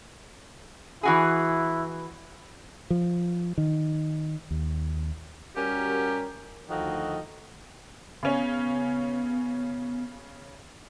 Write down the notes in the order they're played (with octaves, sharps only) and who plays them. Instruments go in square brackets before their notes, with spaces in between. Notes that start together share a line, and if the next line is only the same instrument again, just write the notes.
[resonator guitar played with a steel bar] E3 F#4 G#4 [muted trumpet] E4
[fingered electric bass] F3
D#3
D#2
[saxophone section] G3 C#4 F#4 G4 A#4
D2 D#3 F3 F#4 A4 D#5
[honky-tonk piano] C#3 C#4 [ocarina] B3